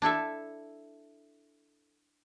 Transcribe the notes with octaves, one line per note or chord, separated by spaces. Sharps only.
D4 E4 A4 E5